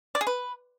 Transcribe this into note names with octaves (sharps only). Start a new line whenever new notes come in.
D5
G#4
B4